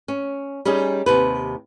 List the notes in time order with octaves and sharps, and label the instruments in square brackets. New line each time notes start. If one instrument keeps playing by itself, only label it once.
[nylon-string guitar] C#4
G3 C#4 D#4 G#4
D#2 C3 B4